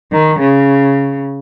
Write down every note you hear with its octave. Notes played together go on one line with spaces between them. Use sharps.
D#3
C#3